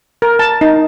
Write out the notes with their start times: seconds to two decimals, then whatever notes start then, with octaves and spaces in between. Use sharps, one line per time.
0.22 A#4
0.39 A5
0.61 D#4